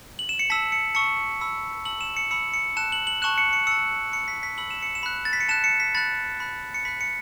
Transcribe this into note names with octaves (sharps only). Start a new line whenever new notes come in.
F#7
E7
C#7
A5 E6 B6
C#7
A5 C#6 E6 C#7
B5 E6
A5 E6 F#7
E7
C#7
B5 E6 C#7
C#7
A5 F#6 E7
F#7
F#7
A5 C#6 F#6 E7
C#7
C#7
A5 E6 C#7
B5 F#6 C#7
B6
B6
B5 E6 F#7
E7
C#7
E7
B5 F#6
A6
B6
C#7
A5 F#6 E7
C#7
B6
B5 F#6 A6
B5 F#6
C#7
B5 F#6 B6
C#7